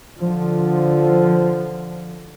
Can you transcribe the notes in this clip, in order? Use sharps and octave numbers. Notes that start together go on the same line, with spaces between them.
D3 F3